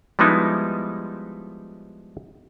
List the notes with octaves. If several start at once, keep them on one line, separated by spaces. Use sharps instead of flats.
F3 G3 G#3 B3 D#4 E4